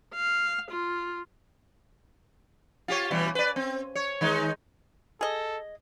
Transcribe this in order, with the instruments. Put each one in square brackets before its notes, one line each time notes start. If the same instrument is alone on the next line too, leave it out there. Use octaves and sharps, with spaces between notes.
[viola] F5
F4
[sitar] F4 G4 C#5
B2 E3 G3
B4 D5
C4
C#5
D#3 G#3 D#4
[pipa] G#4 D#5 [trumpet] A4